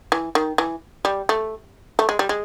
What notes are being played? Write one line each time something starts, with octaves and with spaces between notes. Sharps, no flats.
E3
D#3
E3
G3
A3
A3
G#3
G3
G#3